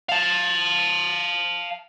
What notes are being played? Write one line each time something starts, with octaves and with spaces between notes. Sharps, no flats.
F5 A5